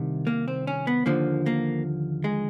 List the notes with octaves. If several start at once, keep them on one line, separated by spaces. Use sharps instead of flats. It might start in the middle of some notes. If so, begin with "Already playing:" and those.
Already playing: C2 C3 D#3
A#3
C4
C#4
B3
D#2 D3 F3 A#3
A#3
G#3